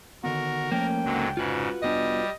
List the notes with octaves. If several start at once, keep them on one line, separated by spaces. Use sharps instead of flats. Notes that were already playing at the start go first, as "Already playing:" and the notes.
D3 D#3 B3 F#4 A#4
F3 A3 A#3 C#4 G5
C#2 G#2 D3 F#3
F1 G#2 C#3 F4 F#4 B4
F1 G3 B3 D4 D#5